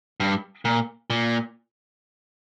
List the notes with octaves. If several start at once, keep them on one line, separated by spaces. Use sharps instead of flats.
G2
A#2
A#2